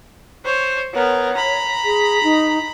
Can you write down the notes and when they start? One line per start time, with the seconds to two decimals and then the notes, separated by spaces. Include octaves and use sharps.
0.45 C5 C#5
0.93 B3 A#4 C#5
1.35 A#5 B5
1.85 G#4
2.23 D#4